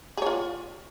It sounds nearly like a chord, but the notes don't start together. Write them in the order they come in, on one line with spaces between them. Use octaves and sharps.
G#4 C#5 F4